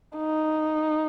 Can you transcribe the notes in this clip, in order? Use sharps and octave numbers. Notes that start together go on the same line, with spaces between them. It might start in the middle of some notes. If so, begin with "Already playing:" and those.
D#4